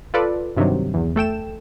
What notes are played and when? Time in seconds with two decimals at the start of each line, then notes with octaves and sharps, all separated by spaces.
0.14 F4 A4 B4 D5
0.57 G2 C3 D#3 F#3
0.94 E2
1.16 A3 A4 G5 E7